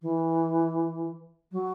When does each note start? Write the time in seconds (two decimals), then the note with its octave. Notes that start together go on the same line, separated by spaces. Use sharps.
0.02 E3
1.52 F#3